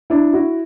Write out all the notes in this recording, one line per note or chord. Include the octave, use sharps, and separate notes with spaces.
D4 E4
E4 F#4